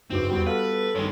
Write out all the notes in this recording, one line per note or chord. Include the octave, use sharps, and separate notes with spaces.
F#1 G2 C#3 C4 D#4 F#4 D6
E2 G3 B3 F#4 B5
A4 B4 D5 F5 F#5
G2 D#3 G#3 B3 C#5